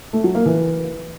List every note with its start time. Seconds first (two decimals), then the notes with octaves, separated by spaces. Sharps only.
0.13 A3
0.24 F#3
0.35 A#3
0.46 E3